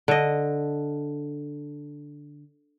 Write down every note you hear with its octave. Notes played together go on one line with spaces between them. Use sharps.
D3 D#5